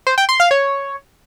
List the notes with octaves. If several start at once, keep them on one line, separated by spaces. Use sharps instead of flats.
C5
G5
C6
F5
C#5